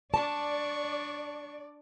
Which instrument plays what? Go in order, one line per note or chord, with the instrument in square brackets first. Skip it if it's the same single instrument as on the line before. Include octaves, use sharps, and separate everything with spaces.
[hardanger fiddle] D4 C#6 [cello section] D5 [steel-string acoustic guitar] A5